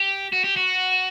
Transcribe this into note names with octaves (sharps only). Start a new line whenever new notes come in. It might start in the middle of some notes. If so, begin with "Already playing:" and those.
Already playing: G4
F#4
G4
F#4